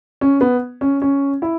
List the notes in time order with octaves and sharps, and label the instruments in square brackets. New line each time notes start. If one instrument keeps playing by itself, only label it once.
[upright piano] C#4
B3
C#4
C#4
E4